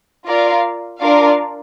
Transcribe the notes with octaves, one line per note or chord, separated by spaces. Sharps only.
F4 A#4 D5 F5
D4 F4 A#4 D5 F5